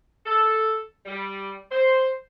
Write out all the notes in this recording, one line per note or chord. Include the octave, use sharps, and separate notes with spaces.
A4
G3
C5